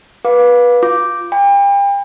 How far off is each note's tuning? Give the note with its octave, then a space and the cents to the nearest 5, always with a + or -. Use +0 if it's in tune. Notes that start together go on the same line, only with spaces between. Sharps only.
B4 -20 F5 +30 D6 +0
F4 +0 D6 +0
G5 +35 B5 +0